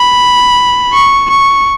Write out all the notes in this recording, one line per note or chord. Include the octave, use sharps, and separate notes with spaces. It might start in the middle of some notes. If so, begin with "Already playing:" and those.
Already playing: B5
C#6
C#6